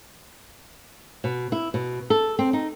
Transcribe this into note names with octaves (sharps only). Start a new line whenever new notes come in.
B2
E4
B2
A4
C4
D#4